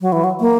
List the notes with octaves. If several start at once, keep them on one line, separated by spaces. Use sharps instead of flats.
F#3
E3
F#3
A#3